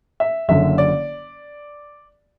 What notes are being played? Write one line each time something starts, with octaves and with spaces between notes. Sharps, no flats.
E5
F#1 F#2 D3 E5
D5